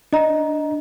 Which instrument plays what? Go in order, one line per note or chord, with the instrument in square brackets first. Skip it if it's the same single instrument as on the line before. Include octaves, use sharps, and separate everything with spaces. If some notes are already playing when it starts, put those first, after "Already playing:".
[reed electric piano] D4 [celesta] D#5 A#5